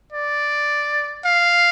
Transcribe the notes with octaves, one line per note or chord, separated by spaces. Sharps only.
D5
F5